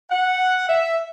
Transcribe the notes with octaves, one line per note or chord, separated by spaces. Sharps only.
F#5
E5